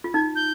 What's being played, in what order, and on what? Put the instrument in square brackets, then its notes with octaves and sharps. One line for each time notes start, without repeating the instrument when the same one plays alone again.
[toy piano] F4
[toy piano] D#4 [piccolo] G#6
[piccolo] G6